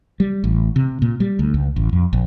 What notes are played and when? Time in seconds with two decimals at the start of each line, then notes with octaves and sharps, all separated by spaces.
0.20 G3
0.44 A1
0.76 C3
1.02 A#2
1.20 G3
1.39 D2
1.54 C#2
1.76 A1
1.93 F2
2.13 A#1